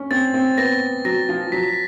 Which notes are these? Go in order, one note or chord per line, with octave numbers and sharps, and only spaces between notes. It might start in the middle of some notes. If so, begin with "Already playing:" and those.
Already playing: C#4
C4 A6
C4
B3 A#6
F#3 A#6
F3
F#3 B6